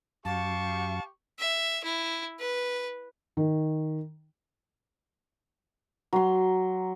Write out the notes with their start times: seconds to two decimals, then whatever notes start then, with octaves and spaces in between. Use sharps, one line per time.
0.25 F#2 G4 F5 A5 C#6
1.39 E5
1.84 E4
2.40 B4
3.37 D#3
6.13 F#3 C6